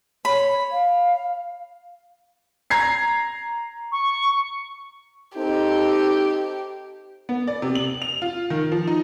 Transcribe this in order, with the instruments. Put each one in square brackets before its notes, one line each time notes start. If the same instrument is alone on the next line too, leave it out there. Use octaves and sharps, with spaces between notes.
[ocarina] C#5 [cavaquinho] B5
[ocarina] F5
[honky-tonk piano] A#5 G#6 C7
[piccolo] C#6
[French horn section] C4 D#4 A4 [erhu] G4
[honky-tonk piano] B3
D5
C3
F#7
F7
F4
D#3
F3
D#4